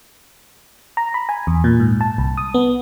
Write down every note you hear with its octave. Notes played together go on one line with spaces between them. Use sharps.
A#5
B5
G#5
E2
A#2
G#2
A5
C2
D#6
B3